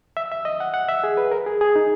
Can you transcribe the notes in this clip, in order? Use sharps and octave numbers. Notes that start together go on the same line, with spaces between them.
E5
E5
D#5
F#5
F#5
E5
G#4
B4
A#4
G#4
G#4
D#4